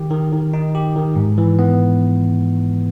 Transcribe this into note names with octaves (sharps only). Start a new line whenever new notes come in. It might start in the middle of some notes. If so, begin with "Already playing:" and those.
Already playing: D#3 G4
D#3
D#3
D#4
G4
D#3
G#2
E3
B3